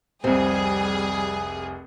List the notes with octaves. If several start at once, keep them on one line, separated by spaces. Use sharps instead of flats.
F1 C2 G3 C4 G#4